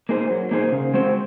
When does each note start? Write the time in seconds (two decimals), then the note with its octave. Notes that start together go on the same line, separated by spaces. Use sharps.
0.09 A#3 D#4 G#4 C5
0.30 F#3
0.51 A#3 D#4 G#4 C5
0.72 C#3
0.94 G#3 C4 F#4 C5